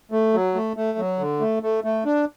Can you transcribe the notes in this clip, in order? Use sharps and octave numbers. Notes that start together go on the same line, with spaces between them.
A3
F#3
A3
A3
F#3
D3
A3
A3
A3
D4